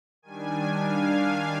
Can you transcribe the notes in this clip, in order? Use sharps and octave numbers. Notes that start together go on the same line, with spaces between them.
D#3 G3 D4 G#5
F5